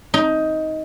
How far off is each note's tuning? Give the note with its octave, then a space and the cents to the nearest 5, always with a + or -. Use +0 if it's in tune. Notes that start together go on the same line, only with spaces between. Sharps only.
D#4 +15